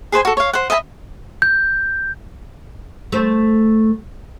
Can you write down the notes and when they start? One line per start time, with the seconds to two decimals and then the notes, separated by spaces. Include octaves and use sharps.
0.12 G#4 B4 C5 G#5
0.25 F#4 A4
0.37 C#5 F5
0.53 C5 F#5
0.70 D#5 E5 G#5 B5
1.42 G6
3.12 A3 C5